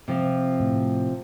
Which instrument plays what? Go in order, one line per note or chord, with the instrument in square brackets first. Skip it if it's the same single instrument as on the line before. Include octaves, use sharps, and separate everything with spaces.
[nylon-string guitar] C3 F3 C4 F4
[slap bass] A2